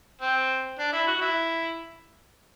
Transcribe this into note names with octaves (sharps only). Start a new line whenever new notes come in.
C4
D4
E4
F#4
E4